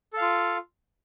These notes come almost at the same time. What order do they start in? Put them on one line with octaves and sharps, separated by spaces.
A4 F5 F4